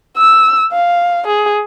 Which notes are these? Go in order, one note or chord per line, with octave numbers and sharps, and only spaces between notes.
E6
F5
G#4